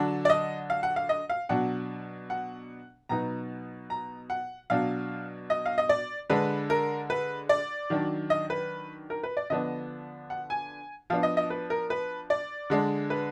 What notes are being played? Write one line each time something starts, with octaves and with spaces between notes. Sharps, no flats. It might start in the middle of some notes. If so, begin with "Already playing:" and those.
Already playing: D3 F#3 D4
D5
D#5
F5
F#5
F5
D#5
F5
B2 F#3 D4 F#5
F#5
B2 F#3 B3 D#4 A#5
A#5
F#5
B2 F#3 D4 F5
D#5
F5
D#5
D5
D3 G#3 D4 B4
A#4
B4
D5
D#3 F#3 D4
D#5
B4
A#4
B4
D5
D3 F3 B3 D4 D#5
F#5
G#5
F3 B3 D4 F5
D#5
D#5
B4
A#4
B4
D5
D3 G#3 D4
B4